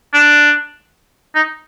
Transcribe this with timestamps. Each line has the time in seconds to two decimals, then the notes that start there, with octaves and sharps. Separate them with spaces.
0.14 D4
1.35 D#4